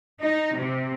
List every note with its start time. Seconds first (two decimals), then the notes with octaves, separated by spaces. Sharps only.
0.22 D#4
0.56 C3